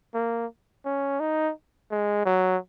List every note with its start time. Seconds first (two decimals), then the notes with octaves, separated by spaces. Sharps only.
0.14 A#3
0.85 C#4
1.20 D#4
1.91 G#3
2.25 F#3